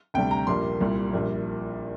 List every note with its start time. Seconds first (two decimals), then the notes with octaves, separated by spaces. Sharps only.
0.14 D2 C3 G3 G5
0.31 A#5
0.47 A#1 A#2 G3 A#3 C6
0.80 C2 A#2 G3 A#3
1.13 A#1 A#2 G3